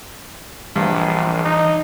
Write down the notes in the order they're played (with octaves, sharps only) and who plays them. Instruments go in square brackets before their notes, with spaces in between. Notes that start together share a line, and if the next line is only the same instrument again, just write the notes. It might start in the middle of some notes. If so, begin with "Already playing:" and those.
[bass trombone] A#1 [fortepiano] G2 [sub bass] E3
[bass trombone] D#4